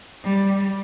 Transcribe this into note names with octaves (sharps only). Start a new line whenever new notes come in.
G3